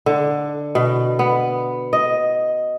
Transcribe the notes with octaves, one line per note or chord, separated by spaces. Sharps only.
D3
B2
B3
D#5